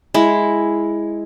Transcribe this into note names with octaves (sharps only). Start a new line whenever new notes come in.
G#3 E4